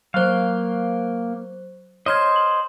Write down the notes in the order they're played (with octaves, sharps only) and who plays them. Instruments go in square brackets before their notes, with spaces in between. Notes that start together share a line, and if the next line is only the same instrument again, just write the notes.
[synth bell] F#3 C5 [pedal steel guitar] A#3 F5
[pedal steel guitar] C5 D#5 [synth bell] C#5 F6 G#6
[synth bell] F#7